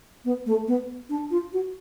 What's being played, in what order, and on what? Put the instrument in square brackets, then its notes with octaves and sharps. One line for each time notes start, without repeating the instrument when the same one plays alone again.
[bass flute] B3
A3
B3
D4
F4
F#4